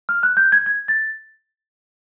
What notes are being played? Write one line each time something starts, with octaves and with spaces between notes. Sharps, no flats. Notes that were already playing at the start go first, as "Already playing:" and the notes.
F6
F#6
G6
G#6
G#6
A6